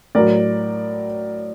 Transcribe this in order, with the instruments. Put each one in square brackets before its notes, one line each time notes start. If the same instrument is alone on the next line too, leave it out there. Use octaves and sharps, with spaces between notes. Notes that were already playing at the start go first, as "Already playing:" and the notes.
[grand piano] A2 F#3 A#4 D5